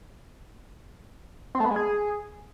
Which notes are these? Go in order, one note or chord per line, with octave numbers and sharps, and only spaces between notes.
C4
A3
B3
G#3
G#4